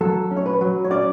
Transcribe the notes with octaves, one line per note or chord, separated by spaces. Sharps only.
F#3 A4
C#4
C#5
B4
F#3
C#5
C#4 D5